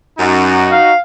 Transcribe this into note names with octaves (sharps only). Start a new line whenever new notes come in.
F#2 D#4 F#4
F5